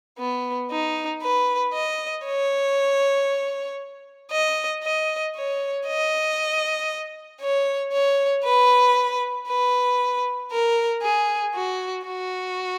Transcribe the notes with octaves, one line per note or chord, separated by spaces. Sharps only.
B3
D#4
B4
D#5
C#5
D#5
D#5
C#5
D#5
C#5
C#5
B4
B4
A#4
G#4
F#4
F#4